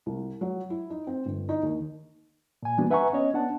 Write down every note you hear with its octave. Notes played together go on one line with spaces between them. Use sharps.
C2
F#3
E4
D#4
C4
G1
D#4
D#2
A#2 G#5
E3 G3 A#3 B3 D4 F#4
B4 E5 F#5 G#5 A#5 C#6
B3 C#4 C#5 D#5
B3 D4 F#5 A5